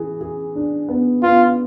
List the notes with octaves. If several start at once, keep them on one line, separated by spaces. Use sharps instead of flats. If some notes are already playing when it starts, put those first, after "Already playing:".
Already playing: E3 G#4
G#4
D4
B3
B3 F4